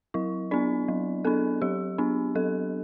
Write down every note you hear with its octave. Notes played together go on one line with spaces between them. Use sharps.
F#3 E4
B3 D4 D5
F#3
B3 D4 A4
F#3 G4
B3 D4
F#3 A4